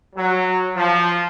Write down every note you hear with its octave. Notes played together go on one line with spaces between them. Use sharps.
F#3
F3